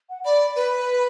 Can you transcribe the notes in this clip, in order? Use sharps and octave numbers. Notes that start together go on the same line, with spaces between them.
F#5
D5 B5
B4